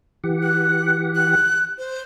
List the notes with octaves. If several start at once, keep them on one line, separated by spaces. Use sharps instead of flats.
E3 G4 F#5
F#6
F#6
C5